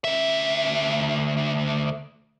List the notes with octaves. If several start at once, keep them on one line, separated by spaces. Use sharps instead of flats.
D2 E5